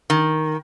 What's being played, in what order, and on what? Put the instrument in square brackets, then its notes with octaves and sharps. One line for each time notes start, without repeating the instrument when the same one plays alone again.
[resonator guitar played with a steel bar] D#3